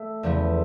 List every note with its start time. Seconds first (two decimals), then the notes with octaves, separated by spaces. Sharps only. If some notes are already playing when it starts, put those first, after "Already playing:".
Already playing: A3
0.23 E2 C#3 F3 A3